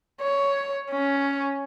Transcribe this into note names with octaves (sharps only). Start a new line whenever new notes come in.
C#5
C#4